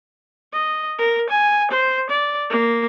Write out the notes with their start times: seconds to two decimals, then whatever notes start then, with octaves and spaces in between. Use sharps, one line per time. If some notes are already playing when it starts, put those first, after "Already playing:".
0.53 D#5
0.99 A#4
1.30 G#5
1.71 C5
2.10 D5
2.50 A#3